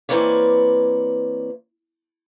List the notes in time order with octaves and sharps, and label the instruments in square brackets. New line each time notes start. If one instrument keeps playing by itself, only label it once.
[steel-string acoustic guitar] E3 A#3 C4 B4 C#5 D5